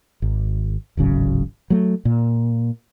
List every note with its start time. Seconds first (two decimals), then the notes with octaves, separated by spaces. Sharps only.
0.22 G#1
0.97 D1 G#1 C#3 F#3
1.70 F#3 A3
2.05 A#2